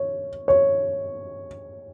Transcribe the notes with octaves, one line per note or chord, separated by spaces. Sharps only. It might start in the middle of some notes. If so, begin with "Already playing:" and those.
Already playing: C#5
C#5